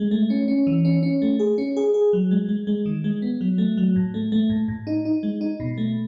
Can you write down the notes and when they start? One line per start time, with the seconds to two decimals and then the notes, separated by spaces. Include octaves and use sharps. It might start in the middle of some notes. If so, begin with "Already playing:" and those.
Already playing: G#3
0.11 A3
0.30 C#4
0.48 C#4
0.67 E3
0.85 C#4
1.03 C#4
1.22 A3
1.39 G#4
1.58 C#4
1.77 G#4
1.94 G#4
2.13 F#3
2.31 G#3
2.49 G#3
2.67 G#3
2.86 D#3
3.04 G#3
3.22 B3
3.41 F#3
3.58 A3
3.77 F#3
3.96 A2
4.14 A3
4.32 A3
4.50 A2
4.68 A2
4.87 D#4
5.05 D#4
5.23 G#3
5.41 D#4
5.60 B2
5.78 A3